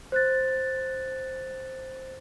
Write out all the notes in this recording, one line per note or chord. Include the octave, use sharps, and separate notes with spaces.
C5 F#6 A6